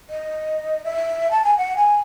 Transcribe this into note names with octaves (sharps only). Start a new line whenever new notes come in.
D#5
E5
A5
G#5
F#5
G#5